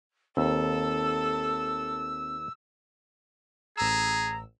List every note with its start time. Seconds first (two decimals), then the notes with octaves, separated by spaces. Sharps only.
0.37 D#2 C4 A4 E6
3.77 A1 G#4 A#5 E6